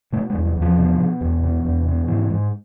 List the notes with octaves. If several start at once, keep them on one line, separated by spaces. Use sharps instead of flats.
B2 A3
G#3
E2
F#3
E2
F3
B2
B2
E2
B2
E2
B2
G#2 E3
G#2